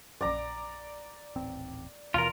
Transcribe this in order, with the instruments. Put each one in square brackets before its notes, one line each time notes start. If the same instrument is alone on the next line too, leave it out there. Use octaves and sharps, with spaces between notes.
[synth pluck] A#1 F#2 [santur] D5 A#5
[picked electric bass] D#1 A1 C4
[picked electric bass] D#2 B2 E3 [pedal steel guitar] F4 A#4 [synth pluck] A5